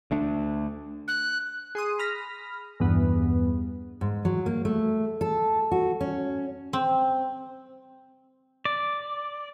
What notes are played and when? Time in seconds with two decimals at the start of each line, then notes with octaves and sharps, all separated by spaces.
0.11 D2 A3 D4
1.08 F#6
1.75 G#4 C6 D#6
1.99 B5 F6 A#6 B6
2.80 E2 G2 B3
4.01 G#2
4.25 F#3
4.46 A#3
4.65 A3
5.21 A4
5.71 F#4
6.01 C#4
6.73 C4
8.65 D5